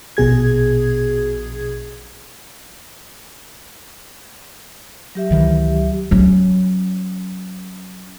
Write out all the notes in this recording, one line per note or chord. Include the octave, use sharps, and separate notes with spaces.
A#1 B2 G#4 G#6
F#3 G4 E5
C#2 D#3 E3
F#3 C#4